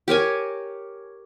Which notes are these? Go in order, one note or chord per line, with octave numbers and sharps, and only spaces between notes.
G4 A#4 C#5 G#5